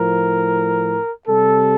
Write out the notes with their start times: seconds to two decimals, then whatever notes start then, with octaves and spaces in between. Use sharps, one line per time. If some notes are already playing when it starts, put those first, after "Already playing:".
Already playing: A2 F3 A#4
1.27 C3 G3 A4